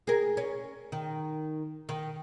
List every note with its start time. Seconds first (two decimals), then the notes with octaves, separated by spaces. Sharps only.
0.07 G#4 A#4
0.37 C#4
0.92 D#3
1.89 D#3